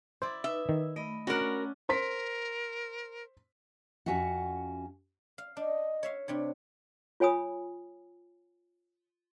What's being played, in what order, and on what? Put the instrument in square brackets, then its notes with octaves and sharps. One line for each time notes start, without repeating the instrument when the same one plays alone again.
[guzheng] E4 D5 [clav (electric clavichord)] C5
[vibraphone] D#4 B4 [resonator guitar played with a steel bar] E5
[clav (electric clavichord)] D#3
[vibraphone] A3 B5 [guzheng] D#5
[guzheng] C#4 D4 F#5 [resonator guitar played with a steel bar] F#4 A#4
[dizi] A#4 [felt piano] C5 C6 B6
[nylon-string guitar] F2 E3 C#4 F#4 E5 F#5
[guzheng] F5
[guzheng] D4 [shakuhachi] D#5
[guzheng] C#5 E5 F5
[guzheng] C3 G3 C#5 [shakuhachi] D4
[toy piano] F4 C#5 G#5 B5 D#6